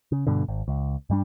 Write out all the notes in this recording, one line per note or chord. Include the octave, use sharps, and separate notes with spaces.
C#3
G2 B2 D3
G#1
C#2
G2 G3 D4